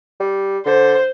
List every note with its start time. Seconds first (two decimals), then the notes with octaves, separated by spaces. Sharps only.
0.20 G3
0.66 D3 C5